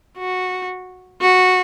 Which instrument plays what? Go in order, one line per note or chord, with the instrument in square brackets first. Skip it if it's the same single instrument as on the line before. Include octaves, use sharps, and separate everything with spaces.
[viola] F#4
F#4